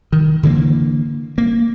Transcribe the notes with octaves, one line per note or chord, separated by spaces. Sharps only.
D#3
D3 E3 G3 A#3
A#3